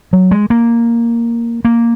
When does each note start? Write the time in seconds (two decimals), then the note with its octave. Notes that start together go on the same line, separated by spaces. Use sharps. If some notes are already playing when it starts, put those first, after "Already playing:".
0.13 F#3
0.31 G#3
0.50 A#3
1.65 A#3